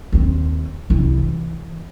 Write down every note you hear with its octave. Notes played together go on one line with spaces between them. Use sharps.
D#2 C4
C2 E4
E3